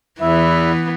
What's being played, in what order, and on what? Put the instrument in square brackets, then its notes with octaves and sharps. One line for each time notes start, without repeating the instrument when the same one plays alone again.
[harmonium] E2 E4 E5 [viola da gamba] E3 B3